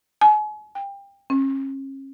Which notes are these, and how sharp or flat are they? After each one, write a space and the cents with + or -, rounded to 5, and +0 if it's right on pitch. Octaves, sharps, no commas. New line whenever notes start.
G#5 +40
G5 +25
C#4 -40